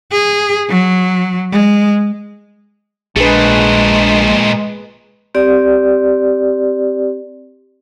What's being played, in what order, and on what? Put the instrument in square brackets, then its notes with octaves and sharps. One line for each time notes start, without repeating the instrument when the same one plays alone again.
[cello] G#4
F#3
G#3
[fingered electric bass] A#1 D4 [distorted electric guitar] A#2 A3 [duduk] G#3 [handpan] G#4 B4
[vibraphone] C4 G4 D5